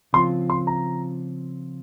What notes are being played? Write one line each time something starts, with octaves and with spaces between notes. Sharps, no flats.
C#3 F3 C4 F4 C6
C6
A#5